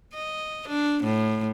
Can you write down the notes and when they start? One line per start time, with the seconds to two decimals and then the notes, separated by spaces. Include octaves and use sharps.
0.15 D#5
0.68 D4
1.04 A2